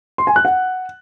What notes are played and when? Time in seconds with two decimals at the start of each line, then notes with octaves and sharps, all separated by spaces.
0.18 C6
0.27 G#5
0.36 F#6
0.45 F#5